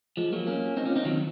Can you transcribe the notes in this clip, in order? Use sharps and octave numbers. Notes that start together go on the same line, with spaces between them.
F3 G#3
F#3 A#3
A#3 C#4
C4 D#4
C#4 F4
C4 D#4
D#3 F#3